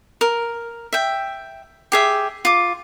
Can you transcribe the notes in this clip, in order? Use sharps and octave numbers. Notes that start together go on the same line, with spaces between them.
A#4
E5 G5
G4 G#4 E5
F4 D6